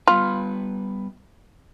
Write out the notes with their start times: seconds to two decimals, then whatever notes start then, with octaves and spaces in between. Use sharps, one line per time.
0.07 G3 B3 F4 B4